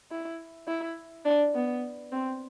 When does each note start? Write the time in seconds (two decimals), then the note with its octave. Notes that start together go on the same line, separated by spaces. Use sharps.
0.11 E4
0.67 E4
1.25 D4
1.55 B3
2.12 C4